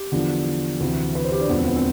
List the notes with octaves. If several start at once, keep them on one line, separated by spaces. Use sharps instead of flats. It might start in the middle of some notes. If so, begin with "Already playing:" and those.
Already playing: G4
E2 D3 F3
D2 C3 E3
B4
C5
G4
D4
E1 D2 D3 F3 B3
C4
B3
C4